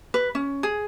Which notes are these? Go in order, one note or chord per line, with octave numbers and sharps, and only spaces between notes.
B4
C#4
G#4